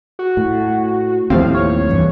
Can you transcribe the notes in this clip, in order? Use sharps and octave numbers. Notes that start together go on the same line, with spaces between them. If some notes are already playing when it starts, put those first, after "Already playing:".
F#4
A2
D#2 A2 F3 G3 C4 F5
C#5
E2 G2 C3